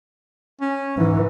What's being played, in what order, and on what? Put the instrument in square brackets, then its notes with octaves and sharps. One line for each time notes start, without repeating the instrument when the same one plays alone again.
[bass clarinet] C#4
[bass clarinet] G#2 [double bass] E3